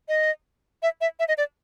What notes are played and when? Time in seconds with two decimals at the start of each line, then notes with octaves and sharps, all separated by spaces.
0.08 D#5
0.83 E5
1.01 E5
1.19 E5
1.28 D#5
1.38 D5